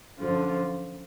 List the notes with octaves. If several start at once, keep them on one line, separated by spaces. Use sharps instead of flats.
F#2 D3 F3